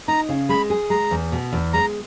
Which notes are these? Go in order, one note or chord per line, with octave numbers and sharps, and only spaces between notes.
D#4 A#5
C#3
G#3 B5
G#4
G#3 A#5
E2
B2
E2
G#3 A#5